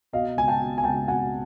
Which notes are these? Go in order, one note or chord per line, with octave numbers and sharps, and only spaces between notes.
B2 D#5 F5
C#2 G#5
G5 A5
B2
G#5
C#2 G5 A5
B2 F#5 G#5